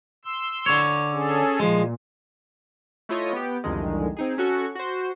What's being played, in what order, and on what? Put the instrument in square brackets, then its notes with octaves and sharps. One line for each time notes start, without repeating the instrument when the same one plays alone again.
[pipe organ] C6 E6
[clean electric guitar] D3 C#5
[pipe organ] C#4 G#4 A4
[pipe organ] A#2 [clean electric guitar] F3 G#3
[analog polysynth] A3 E4 F4 C#5 D#5
B3 G4
C2 F2 D3 D#3 G#3
C4 D#4 G#4
C#4 F#4 A4 C#6
F#4 C5